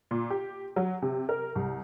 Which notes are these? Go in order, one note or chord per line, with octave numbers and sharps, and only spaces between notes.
A#2
G4
F#3
C3
A#4
C2